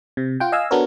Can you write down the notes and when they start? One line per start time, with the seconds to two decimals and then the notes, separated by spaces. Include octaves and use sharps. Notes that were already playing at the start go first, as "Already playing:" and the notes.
0.17 C3
0.40 F4 F#5 G5
0.52 D#5 F5 G#5 E6
0.71 B3 D4 F#4 A4 A#4 C#5